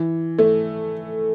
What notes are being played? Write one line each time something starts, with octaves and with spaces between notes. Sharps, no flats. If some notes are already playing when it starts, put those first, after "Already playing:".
Already playing: E3
A3